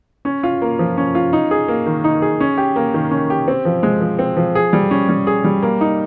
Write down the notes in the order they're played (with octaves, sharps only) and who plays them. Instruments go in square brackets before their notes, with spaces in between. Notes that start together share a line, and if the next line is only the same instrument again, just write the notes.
[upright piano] C#4
F4
A#3
F3
C#4
F4
D#4
G#4
A#3
D#3
D#4
G#4
C#4
G4
A#3
D#3
C#4
G4
C4
F3
G#3
F3
C4
F3
G#4
G3
C#4
G3
G#4
G3
A#3
D#4